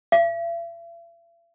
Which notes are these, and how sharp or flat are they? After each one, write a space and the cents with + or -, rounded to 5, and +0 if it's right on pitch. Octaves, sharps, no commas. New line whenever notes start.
E5 +45